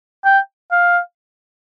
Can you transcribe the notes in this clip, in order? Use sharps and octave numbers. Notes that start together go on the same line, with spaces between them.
G5
F5